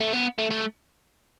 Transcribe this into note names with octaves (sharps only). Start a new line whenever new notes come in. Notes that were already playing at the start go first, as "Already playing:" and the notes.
A3
B3
A3
A3